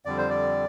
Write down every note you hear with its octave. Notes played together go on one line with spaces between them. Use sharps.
F2 D3 G3 D5
C5
D5